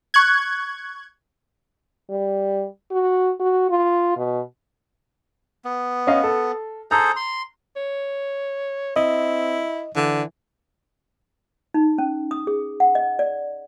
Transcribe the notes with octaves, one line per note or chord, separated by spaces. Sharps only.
C#6 F#6 G#6
G3
F#4
F#4
F4
B2
B3
C#4 D#5 F5
A4
G#4 A4 C5 A#5
C6
C#5
C4 E4 D#5
D3 E3
D#4
C#4
D#6
G#4
F#5
D#5
D5